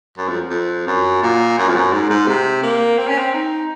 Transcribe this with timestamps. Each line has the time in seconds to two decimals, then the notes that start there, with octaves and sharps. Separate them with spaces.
0.18 F#2
0.28 F2
0.50 F2
0.88 F#2
1.23 A#2
1.58 F#2
1.68 F2
1.75 F#2
1.93 G#2
2.10 G#2
2.28 C3
2.63 A#3
2.98 C4
3.08 C#4
3.18 C4
3.34 D#4